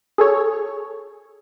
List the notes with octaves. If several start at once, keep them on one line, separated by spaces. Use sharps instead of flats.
G#4 A4 C#5